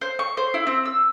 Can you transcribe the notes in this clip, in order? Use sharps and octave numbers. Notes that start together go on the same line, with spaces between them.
C5
C#6
C5
E4
C4
E6